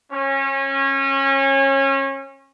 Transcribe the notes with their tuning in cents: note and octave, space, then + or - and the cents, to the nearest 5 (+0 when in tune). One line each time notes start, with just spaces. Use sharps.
C#4 -25